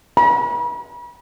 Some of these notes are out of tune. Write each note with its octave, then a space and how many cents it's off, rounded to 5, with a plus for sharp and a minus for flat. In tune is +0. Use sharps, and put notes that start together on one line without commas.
B5 -40